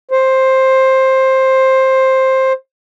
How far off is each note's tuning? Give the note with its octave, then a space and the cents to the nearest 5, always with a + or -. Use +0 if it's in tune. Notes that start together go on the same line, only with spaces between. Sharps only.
C5 +10